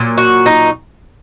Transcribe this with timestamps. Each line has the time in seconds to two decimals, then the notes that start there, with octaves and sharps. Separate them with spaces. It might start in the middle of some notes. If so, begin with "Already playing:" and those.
Already playing: A#2 F#3
0.18 F#4
0.46 D#4